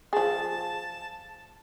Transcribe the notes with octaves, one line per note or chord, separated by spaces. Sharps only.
F3 G#4 A5